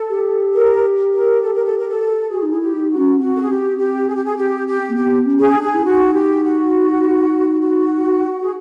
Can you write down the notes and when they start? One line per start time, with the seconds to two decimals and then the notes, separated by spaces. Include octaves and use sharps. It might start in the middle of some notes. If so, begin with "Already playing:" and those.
Already playing: A4
0.09 G4
0.53 A#4
1.13 A#4
1.42 A4
1.54 A#4
1.65 A4
1.78 A#4
1.89 A4
2.30 F#4 G#4
2.42 D#4
2.50 E4 G#4
2.60 G4
2.75 D#4
2.90 F#4
2.97 C#4
3.18 C4 F#4
3.34 A4
3.41 G#4
3.48 G4
3.77 G4
4.08 G#4
4.15 G4
4.25 G#4
4.37 G4
4.67 G4
4.88 A#3
4.95 B3 G4
5.25 C#4
5.40 G#4
5.54 D4
5.62 G#4
5.74 E4
5.85 D#4 F#4
6.13 G4
6.43 F#4
7.60 F#4
8.41 G#4